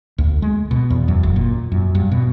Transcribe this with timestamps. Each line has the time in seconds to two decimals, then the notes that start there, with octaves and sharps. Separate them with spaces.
0.18 D2
0.42 G#3
0.71 B2
0.90 E2
1.08 F#2
1.23 F#1
1.36 A#2
1.72 F#2
1.95 G2
2.12 B2